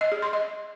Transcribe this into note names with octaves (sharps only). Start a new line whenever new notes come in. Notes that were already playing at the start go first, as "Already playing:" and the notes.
D#5
G#4
C6
D#5